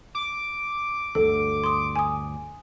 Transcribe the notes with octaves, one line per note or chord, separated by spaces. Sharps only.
D6
D2 G2 D3 A4
C6 D#6
G#5 D#6